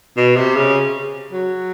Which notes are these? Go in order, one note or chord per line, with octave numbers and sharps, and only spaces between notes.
B2
C3
C#3
F#3